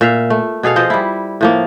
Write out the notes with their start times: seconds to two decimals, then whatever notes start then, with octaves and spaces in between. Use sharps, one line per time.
0.01 A#2 E5 F5
0.30 A3
0.63 B2 G#4 A4 F5
0.76 F3 C5 D#5
0.90 G3 E4
1.41 A2 F3 A#3